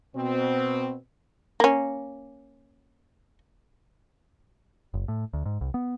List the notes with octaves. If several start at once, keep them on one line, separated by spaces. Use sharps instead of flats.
B2 C4
A#3 C#4
F#1
A2
D2
G#2
C2
B3